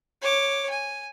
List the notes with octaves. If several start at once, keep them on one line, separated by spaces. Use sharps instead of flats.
C#5 D6
G#5